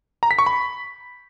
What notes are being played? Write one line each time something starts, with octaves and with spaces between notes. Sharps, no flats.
A#5
B6
C#6
B5